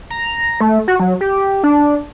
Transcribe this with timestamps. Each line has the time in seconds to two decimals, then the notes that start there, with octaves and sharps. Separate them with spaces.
0.10 A#5
0.61 A3
0.88 F#4
1.00 F#3
1.21 G4
1.63 D4